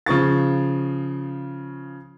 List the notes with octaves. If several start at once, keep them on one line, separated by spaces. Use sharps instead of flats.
C#3 F3 C#6 A6